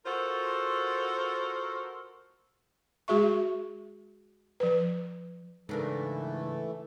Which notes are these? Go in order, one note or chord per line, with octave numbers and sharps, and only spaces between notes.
F4 F#4 A4 A#4 C5
G#3 F#4 G#4 E5 C#6
F3 B4
G#2 C#3 E3 A3 D4 A#4